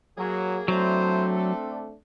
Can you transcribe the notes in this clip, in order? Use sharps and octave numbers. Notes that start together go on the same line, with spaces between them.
F#3 A#3 G#4
F#3 A3 C4 D4 E4 F4 C5
A4